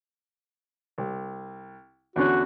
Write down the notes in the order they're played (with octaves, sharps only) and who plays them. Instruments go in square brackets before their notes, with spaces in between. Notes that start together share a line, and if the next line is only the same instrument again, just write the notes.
[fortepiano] C2
[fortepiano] E2 D3 C#4 [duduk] F#4